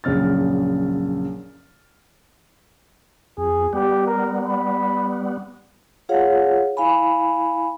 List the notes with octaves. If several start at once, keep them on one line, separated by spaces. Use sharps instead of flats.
A#1 F#2 C#3 F6 A6
F2 G#4
G3 B3 G4
A#4
B5
F4 G#4 C#5 F5 F#5
E4 F5 G#5 B5